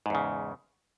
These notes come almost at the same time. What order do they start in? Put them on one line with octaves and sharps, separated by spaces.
G#2 E2 C#3